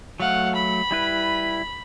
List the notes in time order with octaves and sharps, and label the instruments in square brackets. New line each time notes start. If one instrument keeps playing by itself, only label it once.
[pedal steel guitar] F#3 A3 [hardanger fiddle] F5 F#5
[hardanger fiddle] B5
[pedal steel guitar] G3 E4 B4